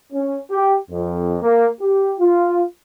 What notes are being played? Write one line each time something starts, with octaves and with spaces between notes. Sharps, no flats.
C#4
G4
F2
A#3
G4
F4